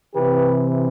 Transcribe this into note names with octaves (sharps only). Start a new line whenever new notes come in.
C3 E3 G4 B4